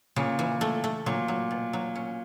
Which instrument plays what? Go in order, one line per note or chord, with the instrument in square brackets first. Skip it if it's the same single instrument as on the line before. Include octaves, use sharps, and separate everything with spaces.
[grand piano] A#2 [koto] C#3
[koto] E3
A3
A3
[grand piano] A#2 [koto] F#3
[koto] F#3
B2
F#3
C#4